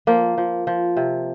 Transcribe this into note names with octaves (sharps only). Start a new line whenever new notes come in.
F3 A#3
F3
F3
C3